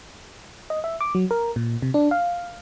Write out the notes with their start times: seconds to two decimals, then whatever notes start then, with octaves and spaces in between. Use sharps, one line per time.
0.70 D#5
0.84 E5
1.01 D6
1.15 F#3
1.31 A#4
1.56 A#2
1.82 C3
1.94 D4
2.11 F5